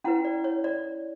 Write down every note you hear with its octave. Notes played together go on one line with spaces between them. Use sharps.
C#4 E4 B4 F#5
D5
C#5
D5